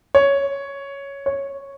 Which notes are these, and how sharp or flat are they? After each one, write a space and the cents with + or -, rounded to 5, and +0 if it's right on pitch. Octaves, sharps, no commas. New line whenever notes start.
C#5 +5
C#5 -5